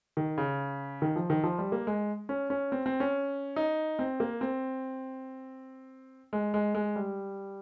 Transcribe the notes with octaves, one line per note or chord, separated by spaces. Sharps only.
D#3
C#3
D#3
F3
D#3
F3
G3
A#3
G#3
C#4
C#4
C4
C4
C#4
D#4
C4
A#3
C4
G#3
G#3
G#3
G3